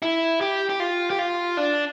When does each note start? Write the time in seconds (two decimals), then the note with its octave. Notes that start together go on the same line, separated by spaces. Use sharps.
0.02 E4
0.41 G4
0.70 G4
0.80 F4
1.10 G4
1.19 F4
1.57 D4